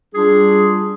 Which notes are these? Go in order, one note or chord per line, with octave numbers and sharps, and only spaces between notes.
G3 D4 F4 G#4